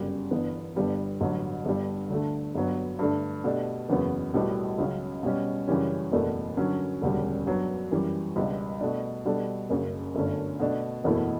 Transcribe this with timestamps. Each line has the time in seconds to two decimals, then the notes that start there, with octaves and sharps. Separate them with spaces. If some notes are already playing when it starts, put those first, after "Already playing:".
Already playing: G1 F#2 C#3 G3
0.31 G1 G2 E3 B3
0.76 G1 G2 D3 G3 B3
1.21 A1 G2 D3 F#3
1.65 G1 G2 D3 G3
2.10 D2 D3 A3
2.55 G1 G2 F#3 B3
2.99 G2 D3 A3 D4
3.44 B2 A3 D4 G4
3.89 F#1 E2 C#3 F#3 B3
4.34 B1 A2 G3 B3 F#4
4.78 C#2 C#3 F#3 C#4
5.23 B2 G3 C#4
5.68 F#2 C#3 E3 G3 C#4
6.12 F#1 E2 B2 A3 D4
6.57 G2 D3 F#3 C#4
7.02 E1 D2 C#3 G3 C#4
7.46 G2 F#3 B3
7.91 F#2 E3 G3
8.36 C#2 B2 G3 B3 D4
8.81 B2 A3 D4
9.25 B2 G3 D4 A4
9.70 F#1 F#2 C#3
10.15 G1 F#2 D3 A3 C#4
10.59 B2 A3 D4
11.04 F#1 E2 B2 A3 E4